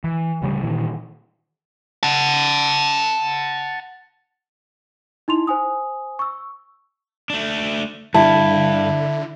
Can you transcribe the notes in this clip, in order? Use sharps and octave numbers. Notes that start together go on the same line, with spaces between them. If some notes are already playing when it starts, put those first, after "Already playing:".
E3
D1 D2 C#3 G3
A#2 D#3 E3
F#5 A5
D#4 E4 C6 F7
C5 G#5 D#6
C#6 E6
A3 D4
G2 D3 E4 A5